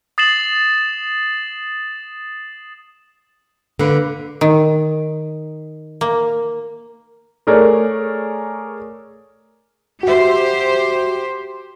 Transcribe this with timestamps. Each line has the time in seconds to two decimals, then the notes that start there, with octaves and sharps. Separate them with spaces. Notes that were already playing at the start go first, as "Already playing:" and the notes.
0.18 D#6 A6 C7 E7 F#7
3.79 D3 A#3 B4
4.41 D#3
6.01 A#3
7.47 A3 G#4 A#4 C#5 D5
10.03 F#4 G4 C5 E5